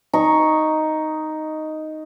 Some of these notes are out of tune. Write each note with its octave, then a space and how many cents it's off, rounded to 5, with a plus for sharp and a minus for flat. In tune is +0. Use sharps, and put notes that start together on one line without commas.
D#4 +0 C#6 +0